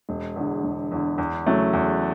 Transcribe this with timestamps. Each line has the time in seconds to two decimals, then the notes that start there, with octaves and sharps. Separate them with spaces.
0.09 E1
0.36 E2 D3
0.63 E1
0.91 E2 D3
1.18 E2
1.46 C#3 F#3 A3 E4
1.73 E2